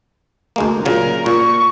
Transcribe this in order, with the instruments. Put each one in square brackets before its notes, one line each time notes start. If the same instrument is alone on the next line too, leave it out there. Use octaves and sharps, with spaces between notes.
[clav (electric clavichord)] D2 G#3 A#3
[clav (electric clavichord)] A#2 C#3 F#3 [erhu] A#4
[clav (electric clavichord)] A#2 [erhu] C#6